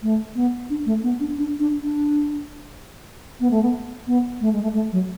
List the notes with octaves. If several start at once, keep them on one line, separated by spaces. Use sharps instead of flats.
A3
B3
D4
A3
B3
D4
D4
D4
D4
B3
A3
B3
B3
A3
G#3
A3
A3
F#3